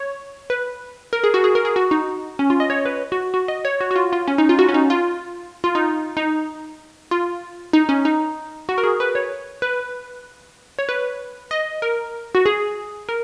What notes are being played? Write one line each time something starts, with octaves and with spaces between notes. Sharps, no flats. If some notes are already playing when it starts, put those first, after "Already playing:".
Already playing: C#5
B4
A#4
G#4
F#4
G#4
A#4
G#4
F#4
D#4
C#4
F4
D#5
C#5
B4
F#4
F#4
D#5
C#5
F#4
F#4
F4
F4
C#4
D#4
F4
F#4
C#4
D#4
F4
F4
D#4
D#4
F4
D#4
C#4
D#4
F#4
A#4
G#4
B4
C#5
B4
C#5
B4
D#5
A#4
F#4
G#4
A#4